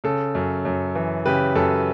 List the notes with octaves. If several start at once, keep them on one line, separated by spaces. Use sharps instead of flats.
C#3 A4
F#2
F#2
E3
C#3 G4 B4
F#2 A4